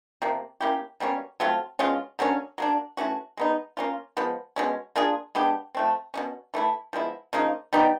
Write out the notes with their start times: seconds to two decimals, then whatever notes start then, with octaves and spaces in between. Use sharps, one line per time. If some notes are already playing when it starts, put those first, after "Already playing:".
0.22 C3 F3 A#3
0.60 A#3 C#4 E4 G4
1.00 B2 G3 A#3 C#4
1.40 F#3 A3 C4 F4
1.79 B2 G#3 C#4 F4
2.19 D3 F#3 A#3 C#4
2.58 F#3 A#3 D4
2.97 E3 A3 C#4 F#4
3.37 G#3 B3 D#4
3.77 A#3 C#4 F4
4.17 F3 G#3 B3
4.56 B2 G#3 C#4
4.96 A#3 D4 F4 G#4
5.35 G#3 B3 D4 G4
5.75 F3 A3 C4
6.14 B2 G#3 C#4
6.54 E3 A3 C4 E4
6.93 F3 G#3 B3 E4
7.33 C#3 F3 A#3 D#4
7.73 G3 B3 D#4 G4